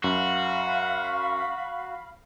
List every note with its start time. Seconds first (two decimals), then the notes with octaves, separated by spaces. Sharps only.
0.04 F#2 F#4 F5 B5